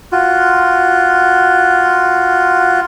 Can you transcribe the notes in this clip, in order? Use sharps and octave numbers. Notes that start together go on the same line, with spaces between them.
F4 F#4